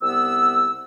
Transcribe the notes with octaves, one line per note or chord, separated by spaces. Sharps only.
C2 B3 E6